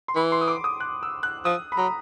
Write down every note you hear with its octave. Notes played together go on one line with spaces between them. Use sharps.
C6
E3 B5
C6
D#6
D6
D#6
F#6
E6
F#6
F3 D#6
B5
F#3 A#5